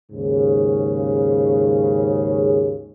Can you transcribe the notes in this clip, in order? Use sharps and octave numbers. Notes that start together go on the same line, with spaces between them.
D#2 G#2 C#3